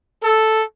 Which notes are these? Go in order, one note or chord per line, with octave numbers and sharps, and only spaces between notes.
A4